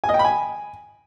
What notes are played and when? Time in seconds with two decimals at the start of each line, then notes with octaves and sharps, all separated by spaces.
0.04 G#5
0.09 D#5
0.14 G5
0.19 B5
0.25 G#5